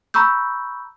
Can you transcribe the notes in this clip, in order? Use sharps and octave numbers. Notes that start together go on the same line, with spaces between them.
A#5 B5 C#6 E6 G6